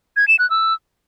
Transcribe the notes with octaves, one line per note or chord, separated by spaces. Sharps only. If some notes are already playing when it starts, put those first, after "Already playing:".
G#6
E7
F#6
E6